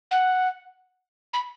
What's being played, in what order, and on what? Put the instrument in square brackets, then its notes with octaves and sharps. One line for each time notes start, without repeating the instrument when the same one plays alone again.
[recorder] F#5
B5